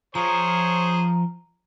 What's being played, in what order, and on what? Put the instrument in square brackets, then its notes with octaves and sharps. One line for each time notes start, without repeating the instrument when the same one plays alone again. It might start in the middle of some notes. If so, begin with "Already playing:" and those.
[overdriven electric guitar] F3 [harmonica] G#4 C5 C#5 [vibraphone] A#5